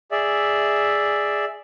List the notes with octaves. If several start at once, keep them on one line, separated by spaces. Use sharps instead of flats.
G#4 D5 E5